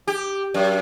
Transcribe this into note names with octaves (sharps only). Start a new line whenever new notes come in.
G4
F#2